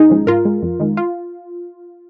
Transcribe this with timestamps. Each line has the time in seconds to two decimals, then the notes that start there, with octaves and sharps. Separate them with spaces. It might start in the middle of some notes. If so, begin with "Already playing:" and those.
Already playing: D#2 D#4 G#4
0.10 C#3 F3 G#3
0.27 G#2 F4 A#4
0.45 G#3
0.62 F2
0.80 D#3 G#3
0.97 F4